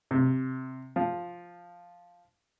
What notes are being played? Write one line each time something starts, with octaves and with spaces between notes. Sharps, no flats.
C3
F3